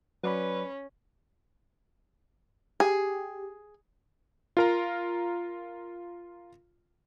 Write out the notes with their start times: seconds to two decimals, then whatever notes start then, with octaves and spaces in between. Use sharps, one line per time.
0.24 F#3 C#4 B4 D5 B5
2.80 G4 G#4
4.57 F4 A#4 A#5